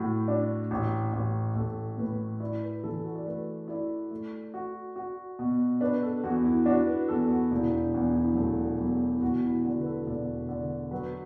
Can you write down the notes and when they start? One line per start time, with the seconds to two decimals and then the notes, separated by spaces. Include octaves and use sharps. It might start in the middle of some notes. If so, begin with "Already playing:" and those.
Already playing: A2 E4 F#4
0.28 D4
0.71 A1
1.13 A1
1.56 A1 A4
1.98 A2 B4
2.40 E4 D5
2.63 B4
2.83 E3 A4
3.04 F#4
3.15 D5
3.25 A3 B4
3.68 E4 D5
4.11 A3
4.54 F#4
4.96 F#4
5.39 B2
5.81 D4 B4
6.02 A4
6.24 E2 F#4
6.45 E4
6.66 D4 F#4
6.87 B4
7.08 E2 A4
7.30 F#4
7.51 E1 E4
7.72 D4
7.94 E2 D4
8.15 E4
8.31 F#3
8.36 E1 A3
8.79 E2 F#3
9.15 E4
9.21 E1 F#4
9.43 E4
9.64 D3 F#4
9.81 B4
9.86 A4
10.06 E1 D5
10.49 D3 D5
10.91 F#3 B4